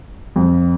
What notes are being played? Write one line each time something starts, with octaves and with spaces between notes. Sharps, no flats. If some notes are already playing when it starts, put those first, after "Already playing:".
F2